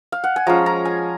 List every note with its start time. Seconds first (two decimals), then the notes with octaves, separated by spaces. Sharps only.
0.12 F5
0.24 F#5
0.36 G#5
0.47 F3 G#3 C#4 F4 A#5
0.66 A#5
0.85 G#5